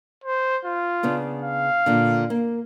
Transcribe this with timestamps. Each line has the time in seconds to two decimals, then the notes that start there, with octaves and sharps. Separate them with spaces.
0.24 C5
0.65 F4
1.03 C#3 B3 D4
1.42 F5
1.86 A#2 D3
2.30 A#3